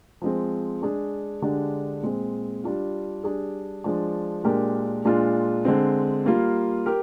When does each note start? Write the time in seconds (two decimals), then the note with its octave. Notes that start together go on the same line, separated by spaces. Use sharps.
0.22 F3 G#3 C4
0.82 G#3 D4 G#4
1.42 D3 G#3 D4 G4
2.03 A#2 G#3 C4
2.64 G3 D4 F4
3.24 G3 D4 G#4
3.84 F3 G#3 D4
4.44 A#2 G#3 D4 G4 A#4
5.05 A#2 G#3 D4 F4
5.65 D3 G#3 C4
6.26 G3 A#3 F4
6.86 G4 A#4